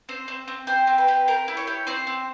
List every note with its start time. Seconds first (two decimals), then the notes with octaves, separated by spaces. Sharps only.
0.09 C4 C5
0.28 C4
0.48 C4
0.67 G4 C5
0.87 C4
0.98 B4
1.08 G4
1.28 G4 A#4
1.48 E4
1.57 C#5
1.67 G4
1.87 C4 C5
2.07 C4